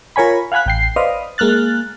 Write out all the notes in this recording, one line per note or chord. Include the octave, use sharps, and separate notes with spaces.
F4 A#4 C#5 G#5 B5
F5 F#5 G#5 B5 F#6
A1 G5 C7
B4 C5 D5 D#5 F5
G#3 A#3 F6 F#6 A6